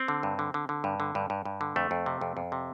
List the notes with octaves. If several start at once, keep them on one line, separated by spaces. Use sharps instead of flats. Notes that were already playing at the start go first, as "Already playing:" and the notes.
Already playing: C4
D3
G2
D3
D3
D3
G2
D3
G2
G2
G2
D3
F2 A3
F2
C3
F2
F2
C3